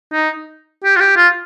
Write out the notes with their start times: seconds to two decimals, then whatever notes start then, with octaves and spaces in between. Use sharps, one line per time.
0.13 D#4
0.84 G4
0.97 F4
1.01 G4
1.16 F4